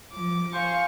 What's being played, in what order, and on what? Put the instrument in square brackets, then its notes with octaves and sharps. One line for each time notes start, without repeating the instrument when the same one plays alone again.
[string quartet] F3 D6
[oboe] C5 [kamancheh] F5 G#5 [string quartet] C#6